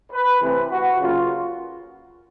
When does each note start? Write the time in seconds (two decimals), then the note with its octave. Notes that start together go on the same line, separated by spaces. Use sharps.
0.11 B4
0.41 C3 E3 A3 C4 B4
0.70 F#4
0.99 C#3 F#3 A#3 F4